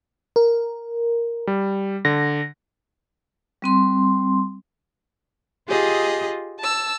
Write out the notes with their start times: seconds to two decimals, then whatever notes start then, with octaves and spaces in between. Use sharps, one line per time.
0.36 A#4
1.47 G3
2.05 D3 A#6
3.62 G3 C4 C6
5.68 F4 G4 G#4 D#5
6.59 A5 E6